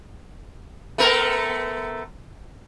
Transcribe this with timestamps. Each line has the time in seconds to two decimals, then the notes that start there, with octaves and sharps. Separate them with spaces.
0.98 A3 B3 A#4